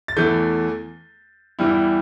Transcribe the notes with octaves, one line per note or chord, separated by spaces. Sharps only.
A6
E2 E3 A3 G6
E2 E3 G3 E4